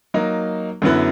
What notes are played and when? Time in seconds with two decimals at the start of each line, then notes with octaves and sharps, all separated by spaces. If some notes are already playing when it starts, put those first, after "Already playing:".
0.14 F#3 A#3 D#4
0.82 F#2 D3 F#3 B3 E4